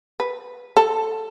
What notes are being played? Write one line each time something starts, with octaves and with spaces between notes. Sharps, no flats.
B4
A4